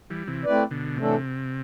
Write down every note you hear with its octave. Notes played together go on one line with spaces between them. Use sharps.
E3 G3
C3 E3
A3 C4 E4 B4 D5
B2 D3
A2 C3 E3 A3 D4 A4